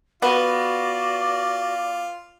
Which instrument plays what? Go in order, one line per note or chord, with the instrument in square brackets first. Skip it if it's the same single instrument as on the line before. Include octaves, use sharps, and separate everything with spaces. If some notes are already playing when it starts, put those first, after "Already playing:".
[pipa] B3 [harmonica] F4 [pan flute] F#4 [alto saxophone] D5